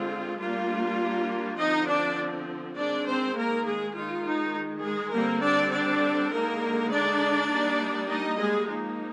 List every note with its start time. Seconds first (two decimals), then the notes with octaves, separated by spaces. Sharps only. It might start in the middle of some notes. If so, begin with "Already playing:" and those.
Already playing: D3 G#3 C4 F4
0.39 G3 A#3 D4 F4
1.58 D3 F3 C4 D#4 D#5
1.87 D4 D5
2.76 D#3 G#3 C4 D4 D5
3.07 C4 C5
3.35 A#3 A#4
3.65 G#3 G#4
3.94 D#3 G#3 D#4 F4
4.24 D#4
4.83 G#3 G#4
5.13 D3 G3 A#3 C4 A#4
5.42 D4 D5
5.72 D4 D5
6.31 D3 G#3 A#3 D#4 A#4
6.91 D4 D5
7.50 G3 A#3 D#4
8.09 D#4 D#5
8.38 G#3 G#4
8.68 F3 A#3 D#4